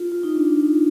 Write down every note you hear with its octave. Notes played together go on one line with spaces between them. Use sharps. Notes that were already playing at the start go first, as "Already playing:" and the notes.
Already playing: F4
F4
D#4
D4